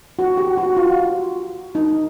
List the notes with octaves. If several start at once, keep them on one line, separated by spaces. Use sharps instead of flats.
F#4
G4
F#4
F4
D#4